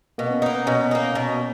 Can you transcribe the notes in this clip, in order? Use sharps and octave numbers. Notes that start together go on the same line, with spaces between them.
B2 A#3
B3
C#4
A#3 B3 D#4
B3
B2 C#4
A#3 D#4
B2